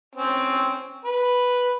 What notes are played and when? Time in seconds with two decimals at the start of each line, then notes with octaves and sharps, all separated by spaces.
0.15 C4 C#4
1.05 B4